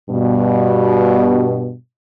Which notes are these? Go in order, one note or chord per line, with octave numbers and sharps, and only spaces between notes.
G2 B2